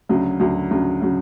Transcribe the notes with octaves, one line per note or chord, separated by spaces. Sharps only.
D2 C#3 F#3
D2 C#3 F#3
D2 C#3 F#3
C#3 F#3